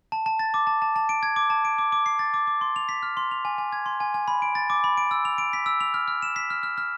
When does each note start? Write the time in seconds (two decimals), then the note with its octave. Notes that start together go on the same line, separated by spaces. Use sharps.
0.12 A5
0.26 A5
0.39 A6
0.54 D6
0.67 A5
0.82 A5
0.96 A5
1.09 D7
1.23 G#6
1.36 D6
1.50 A5
1.65 D7
1.78 D6
1.92 D6
2.06 C7
2.19 A6
2.34 D6
2.47 D6
2.61 C6
2.76 F7
2.89 B6
3.03 F6
3.17 C6
3.31 F7
3.45 G#5
3.58 G#5
3.72 G#6
3.86 C6
4.00 G#5
4.14 G#5
4.28 B5
4.42 D7
4.55 A6
4.70 D6
4.84 B5
4.97 D7
5.11 E6
5.25 F7
5.38 D7
5.53 B6
5.66 E6
5.80 F7
5.94 F6
6.08 F6
6.22 E7
6.36 B6
6.50 F6
6.63 F6
6.78 F6